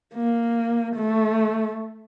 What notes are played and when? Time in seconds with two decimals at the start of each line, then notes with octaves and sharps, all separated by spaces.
0.15 A#3
0.97 A3